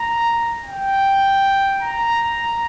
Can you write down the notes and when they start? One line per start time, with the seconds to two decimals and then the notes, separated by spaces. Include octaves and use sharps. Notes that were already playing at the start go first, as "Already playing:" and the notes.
Already playing: A#5
0.65 G5
1.82 A#5